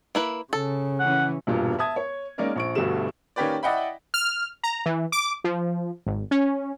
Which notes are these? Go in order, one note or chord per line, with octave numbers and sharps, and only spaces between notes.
A#3 E4 B4
C#3 A4
E3 C#4 F#5
E1 G2 A#2
E5 A5 D#6 G#6
C#5
G#3 A#3 C#4 D#4 A#4 D5
A#1 C#6 D7
D2 G2 B2 D3 A3 E7
D#3 A#3 C#4 G4 B4 D5
E4 D5 D#5 F#5 G5 B5
F6
A#5
E3
D6
F3
G#1
C#4